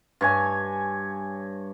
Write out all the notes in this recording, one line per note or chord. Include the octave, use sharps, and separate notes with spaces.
G2 C#5 G#5